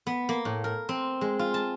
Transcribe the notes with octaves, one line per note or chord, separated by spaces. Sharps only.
B3
A#3
A2
A#4
C4
G#3
F4
A5